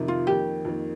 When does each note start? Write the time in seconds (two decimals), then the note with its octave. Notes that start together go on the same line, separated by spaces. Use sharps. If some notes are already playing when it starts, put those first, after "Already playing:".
Already playing: F2 C3 D#3
0.08 F4
0.27 F2 D#3 A#3 G4
0.65 F2 D#3 A#3